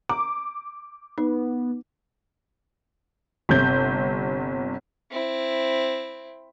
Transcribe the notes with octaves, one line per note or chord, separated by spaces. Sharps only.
A#5 D6
B3 D#4
G1 C3 G6
C4 E4